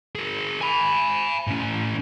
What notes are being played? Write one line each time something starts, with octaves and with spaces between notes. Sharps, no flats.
G#4 A#4
G#5 B5
A2 C#4